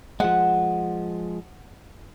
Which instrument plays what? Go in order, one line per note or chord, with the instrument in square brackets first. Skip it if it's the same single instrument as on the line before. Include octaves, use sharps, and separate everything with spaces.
[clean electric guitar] F3 G#3 [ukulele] F#5